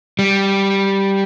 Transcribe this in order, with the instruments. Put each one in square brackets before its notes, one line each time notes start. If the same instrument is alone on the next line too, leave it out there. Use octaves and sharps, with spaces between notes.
[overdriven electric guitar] G3